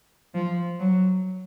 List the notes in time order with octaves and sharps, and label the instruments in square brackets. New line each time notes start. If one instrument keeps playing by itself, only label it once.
[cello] F3
F#3